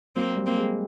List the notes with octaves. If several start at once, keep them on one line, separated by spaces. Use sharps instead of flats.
F#3 A#3 C4
G3
A#3 C4
G#3